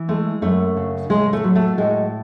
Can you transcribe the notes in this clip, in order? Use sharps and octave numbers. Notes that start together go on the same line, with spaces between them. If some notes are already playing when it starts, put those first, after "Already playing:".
Already playing: E3
G#3 A3
F#2 A3
C#3
A2 G#3
A3
F#3
A3
A2 G#3